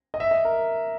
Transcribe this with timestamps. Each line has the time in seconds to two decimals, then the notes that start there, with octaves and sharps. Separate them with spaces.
0.14 D#5
0.20 E5
0.31 D#5
0.45 A#4